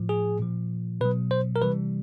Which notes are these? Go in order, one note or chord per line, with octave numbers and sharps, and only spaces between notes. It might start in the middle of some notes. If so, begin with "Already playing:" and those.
Already playing: A2 F3
G#4
A#2 F3
B2 F#3 B4
C5
A#4
C3 E3 G3 B4